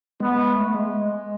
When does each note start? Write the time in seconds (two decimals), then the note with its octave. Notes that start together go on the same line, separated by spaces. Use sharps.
0.20 G#3 B3
0.38 G#3
0.56 A3
0.74 G#3
1.01 G#3